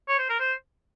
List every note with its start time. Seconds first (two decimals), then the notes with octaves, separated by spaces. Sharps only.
0.08 C#5
0.19 C5
0.29 A#4
0.40 C5